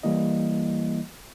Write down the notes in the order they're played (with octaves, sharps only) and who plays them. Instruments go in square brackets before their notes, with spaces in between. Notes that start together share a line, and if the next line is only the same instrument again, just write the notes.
[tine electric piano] E3 G3 A#3 E4 D#5